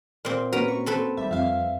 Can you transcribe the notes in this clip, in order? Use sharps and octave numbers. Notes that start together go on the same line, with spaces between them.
A#2 C4
A#3 C#4 F#4 A#4 B4 A#5
C#6
C4 A4 B4
G#1 G3 E5
F2 E5 F5